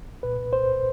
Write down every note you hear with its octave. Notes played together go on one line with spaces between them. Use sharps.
C2 A#2 B4
C5